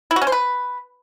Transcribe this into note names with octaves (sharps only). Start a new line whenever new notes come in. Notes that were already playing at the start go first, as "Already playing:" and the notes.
E4
F#4
C#4
C5
B4